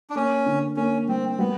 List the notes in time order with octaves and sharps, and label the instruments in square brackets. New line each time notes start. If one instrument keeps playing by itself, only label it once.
[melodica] D4
[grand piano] A#3 [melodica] C#4
[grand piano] D3
[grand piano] A#3 [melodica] C#4
[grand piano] G3 [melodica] C4
[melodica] C4
[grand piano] G3 [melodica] B3